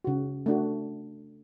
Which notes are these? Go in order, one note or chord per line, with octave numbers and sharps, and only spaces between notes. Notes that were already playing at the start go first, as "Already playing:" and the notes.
C#3 F#4
A3 D4 F#4